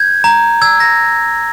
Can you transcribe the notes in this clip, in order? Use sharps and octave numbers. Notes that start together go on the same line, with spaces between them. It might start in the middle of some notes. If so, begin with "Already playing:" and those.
Already playing: G6 G#6
A#5
E6 G#6
A#6